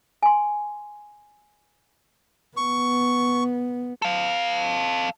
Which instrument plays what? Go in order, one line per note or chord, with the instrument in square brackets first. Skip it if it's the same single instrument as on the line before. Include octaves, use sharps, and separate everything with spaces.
[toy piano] G#5 C6
[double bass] B3 [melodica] C#6
[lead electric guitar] A4 F5